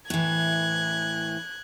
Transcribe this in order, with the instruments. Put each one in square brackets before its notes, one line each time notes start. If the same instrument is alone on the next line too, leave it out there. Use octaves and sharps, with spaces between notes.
[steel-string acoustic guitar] A2 E3 [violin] F#6 G#6